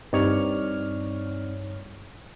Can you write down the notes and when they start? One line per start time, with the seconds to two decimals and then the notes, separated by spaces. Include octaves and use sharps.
0.13 G2 C4 D#4 C#5 D5 F6